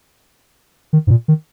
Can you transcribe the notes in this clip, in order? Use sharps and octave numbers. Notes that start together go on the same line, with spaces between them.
D#3
G#2
A#2
D#3